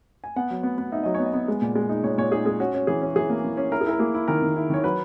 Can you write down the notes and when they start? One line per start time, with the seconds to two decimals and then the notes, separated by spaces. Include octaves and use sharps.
0.24 G#5
0.36 B3 F#5
0.50 F#3
0.63 B3
0.78 B3
0.92 D#4 E5
1.03 F#3 D#5
1.14 B3 C#5
1.26 D#5
1.34 B3
1.48 G#3
1.62 A#2
1.75 G#3
1.89 D#4
2.03 A#2 C#5
2.18 A#2 C#5
2.31 D#4 G#4
2.45 G#3 G#4
2.60 C#4 F#4
2.74 C#4
2.87 E3 G#4
3.02 C#4
3.16 E3 G#4
3.30 A#3
3.44 E3
3.57 C#4
3.71 E4 A#4
3.81 G#4
3.86 E4 A#4
3.99 A#3 G#4
4.14 E4
4.28 D#3 A#4
4.42 D#3
4.56 E4
4.70 D#3 C#5
4.84 F#3 B4